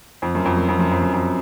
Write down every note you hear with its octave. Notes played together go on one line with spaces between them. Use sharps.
F2
F#2
F2
F#2
F2
F#2
F2
F#2
F2